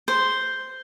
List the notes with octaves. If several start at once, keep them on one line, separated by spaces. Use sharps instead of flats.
C5